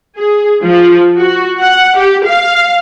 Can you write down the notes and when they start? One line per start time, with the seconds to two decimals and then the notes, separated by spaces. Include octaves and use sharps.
0.17 G#4
0.62 F3
1.17 F#4
1.59 F#5
1.96 G4
2.25 F5